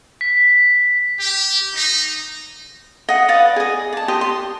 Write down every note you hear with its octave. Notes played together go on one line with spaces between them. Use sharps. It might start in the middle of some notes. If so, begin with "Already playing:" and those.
B6
G4
D#4
D#5 F#5
B4 D5 F5 D#6
G#4 D#5
D5 A5
G4 D#5 C6
C6